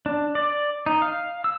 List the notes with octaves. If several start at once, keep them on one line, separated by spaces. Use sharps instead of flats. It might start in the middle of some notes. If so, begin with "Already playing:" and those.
D4
D5
D#4
F5
E6